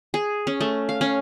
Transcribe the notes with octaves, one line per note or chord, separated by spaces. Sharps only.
G#4
C#4
A3
F5
C#4